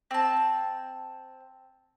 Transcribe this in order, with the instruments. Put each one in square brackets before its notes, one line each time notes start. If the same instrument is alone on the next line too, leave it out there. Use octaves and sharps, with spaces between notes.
[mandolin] C4 A5